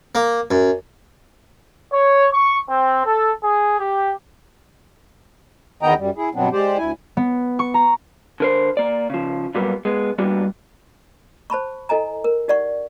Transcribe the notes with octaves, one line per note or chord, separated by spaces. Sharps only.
A#3
F#2
C#5
C#6
C4
A4
G#4
G4
E2 D#3 B3 D#5 G5 A#5
F#2 G3
E4 G#4
G2 B2 F#3 B3 C4 D4
G#3 G4 C5 D5
D2 E4 G#5
B3
C#6
A#5
D3 A#4 C5
A#3 D5
C#3 F3
G2 A#2 F#3 G3 A#3 B3
G#3 B3
G3 A#3 B3 D4 F#4 G4
C5 A5 B5 C#6
E4 A4 D#5 G#5 A#5
A#4
D#4 G4 D5 F#5 C#6